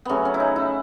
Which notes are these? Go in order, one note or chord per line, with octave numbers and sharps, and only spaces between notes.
C#3 F#3 A3 B3 C#4
C#4
E4
D#4
E4